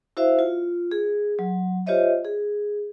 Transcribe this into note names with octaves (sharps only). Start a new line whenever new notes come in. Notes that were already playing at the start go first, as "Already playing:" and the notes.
E4 F#4 C5 E5 F5
F4
G#4
F#3
F4 G4 C5 C#5 D#5 E5
G#4